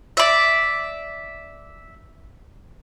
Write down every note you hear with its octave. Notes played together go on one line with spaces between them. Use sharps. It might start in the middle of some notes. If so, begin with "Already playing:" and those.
D5 E5